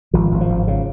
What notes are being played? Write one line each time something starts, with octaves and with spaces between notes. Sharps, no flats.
G#1 F3
G#1
F3
G#1
C#3